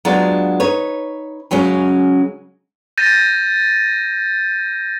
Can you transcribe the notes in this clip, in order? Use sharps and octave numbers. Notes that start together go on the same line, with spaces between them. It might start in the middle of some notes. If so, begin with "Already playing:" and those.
F#3 G#3 B3 D4 F4
D#4 B4 C#5
C#3 F#3 G#3 C#4
G6 A6 A#6 D#7